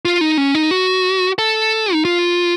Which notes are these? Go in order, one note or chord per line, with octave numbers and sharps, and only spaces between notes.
F4
D#4
C#4
D#4
F#4
A4
D#4
F4